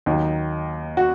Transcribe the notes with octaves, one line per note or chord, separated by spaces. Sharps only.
D#2 D#3 F#3 D#4
F#4